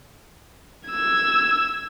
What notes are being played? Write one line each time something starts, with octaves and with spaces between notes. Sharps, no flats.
E6 G#6